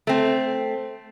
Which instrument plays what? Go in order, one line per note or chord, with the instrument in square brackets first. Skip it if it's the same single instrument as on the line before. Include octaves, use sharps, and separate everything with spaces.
[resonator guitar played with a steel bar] A3 C4